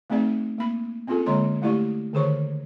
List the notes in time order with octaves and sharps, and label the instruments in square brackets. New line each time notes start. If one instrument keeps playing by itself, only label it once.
[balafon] A3 C4 D#4 G#4 D5 E5
A#3 B5
C4 C#4 F4 G#4 A4
D3 G#3 A#3 C#5 A#5 C6
A3 E4 G4 D5 C#6
D3 D#3 G#4 C5 C#5 C#6